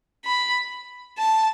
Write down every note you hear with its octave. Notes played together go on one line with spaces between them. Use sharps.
B5
A5